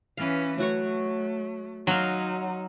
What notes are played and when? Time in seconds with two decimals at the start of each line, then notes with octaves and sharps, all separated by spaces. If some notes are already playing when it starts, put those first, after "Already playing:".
0.17 E3 C#4 B4 F5
0.58 F#3 A3 F#4 C#5
1.87 F#3 D#4 F5 C6 C#6